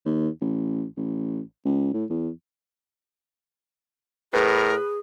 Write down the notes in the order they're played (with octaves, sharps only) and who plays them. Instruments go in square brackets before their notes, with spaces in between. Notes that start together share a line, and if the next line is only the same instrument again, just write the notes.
[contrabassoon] D#2
A1
A1
C#2
A2
E2
[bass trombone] A2 [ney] G#4 [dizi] A#4 [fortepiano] B4